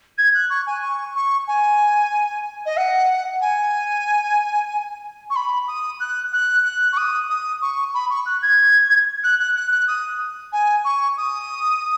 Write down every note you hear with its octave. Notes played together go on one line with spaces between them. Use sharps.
G#6
F#6
C#6
G#5
C#6
C#6
G#5
D#5
F#5
G#5
C#6
B5
D#6
F#6
F#6
F#6
C#6
D#6
D#6
C#6
B5
C#6
F#6
G#6
F#6
F#6
F#6
F#6
D#6
G#5
C#6
D#6